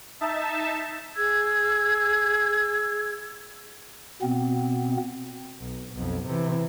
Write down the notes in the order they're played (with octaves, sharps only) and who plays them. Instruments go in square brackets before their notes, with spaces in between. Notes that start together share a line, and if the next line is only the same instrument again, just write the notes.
[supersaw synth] D#4 E5 A5
[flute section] G#4 E6 G#6
[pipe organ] B2 B3 C4
[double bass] B1
B1 F2
C3 E3